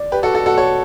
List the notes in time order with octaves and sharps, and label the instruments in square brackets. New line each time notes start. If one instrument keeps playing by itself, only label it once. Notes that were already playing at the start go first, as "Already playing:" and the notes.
Already playing: [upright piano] D5
[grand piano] G4 B4
F#4 A4
F#4 A4
F#4 A4
A4 C#5